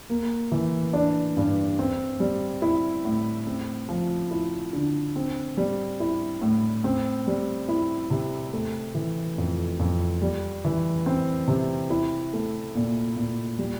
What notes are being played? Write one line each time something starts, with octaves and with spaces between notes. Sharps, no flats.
A#3
E3
D4
G2
C4
G3
E4
A2
C4
F3
E4
D3
C4
G3
E4
A2
C4
G3
E4
C3
A3
E3
F2
F2
G3
E3
C4
C3
E4
A3
A#2
A#2
G3